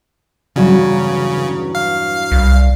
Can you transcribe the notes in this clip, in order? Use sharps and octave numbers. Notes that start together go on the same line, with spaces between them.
E2 G2 C#3 F#3
F5
C2